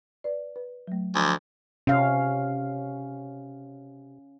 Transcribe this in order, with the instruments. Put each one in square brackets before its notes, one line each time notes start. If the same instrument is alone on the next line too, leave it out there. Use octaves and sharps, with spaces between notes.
[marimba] B4 D5
B4
F#3 A3
[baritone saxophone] D2 [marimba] F3 G#5
[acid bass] C3 [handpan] C#4 F5